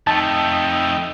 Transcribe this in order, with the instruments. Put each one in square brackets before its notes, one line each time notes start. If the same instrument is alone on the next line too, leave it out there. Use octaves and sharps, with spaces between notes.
[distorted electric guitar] F2 A3 [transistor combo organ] D#4 G5 [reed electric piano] A5